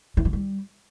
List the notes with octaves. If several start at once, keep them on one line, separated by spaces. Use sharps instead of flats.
E3
F3
G3